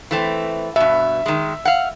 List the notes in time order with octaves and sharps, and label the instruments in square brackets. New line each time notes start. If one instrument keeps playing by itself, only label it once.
[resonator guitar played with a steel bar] E3 A3 C4
[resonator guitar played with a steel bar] G2 B2 [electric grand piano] E5
[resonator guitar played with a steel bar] D#3 G#3
F5 F#5